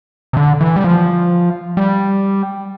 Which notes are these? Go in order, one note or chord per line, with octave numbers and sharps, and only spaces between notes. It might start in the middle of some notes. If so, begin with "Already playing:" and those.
C3
D3
E3
G3
F3
G3